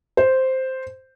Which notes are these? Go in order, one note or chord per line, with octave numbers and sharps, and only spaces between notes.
C5